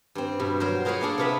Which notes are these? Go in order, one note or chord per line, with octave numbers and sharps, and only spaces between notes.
G2 C4
G2 B2
F#3 A#4 C5
F4 G#4 A#4 B4 C#5 F#5
A#3 B3 D4 G#4 A4
C3 B3 F4 B4 E5 B5